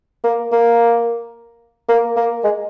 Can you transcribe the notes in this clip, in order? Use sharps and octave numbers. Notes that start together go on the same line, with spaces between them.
A#3
A#3
A#3
A#3
G#3